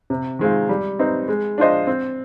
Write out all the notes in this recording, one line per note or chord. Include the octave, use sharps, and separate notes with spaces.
C3
D#3 G#3 C4 F4
G3
C4 D#4 B4
G#3
D4 F4 C5 D#5
C4